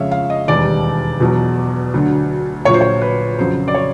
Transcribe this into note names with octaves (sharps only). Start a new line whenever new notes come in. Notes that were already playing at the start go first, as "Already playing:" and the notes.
Already playing: F2 C#3 F3 G#3 C#5 E5 F5
F5
D#5
E1 D#2 D#3 G3 D5
E2 B2 F#3
D2 D3 F#3
A#1 A#2 F#3 C#5
C5
C#5
B4
F2 C#3 F#3 C5
D5
C#5